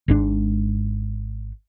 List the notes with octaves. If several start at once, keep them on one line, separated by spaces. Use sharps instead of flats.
G#1 G#2 D4